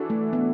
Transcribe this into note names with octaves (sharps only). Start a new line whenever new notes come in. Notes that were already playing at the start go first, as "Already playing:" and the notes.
Already playing: E3 D4 F#4 A4
A3
B3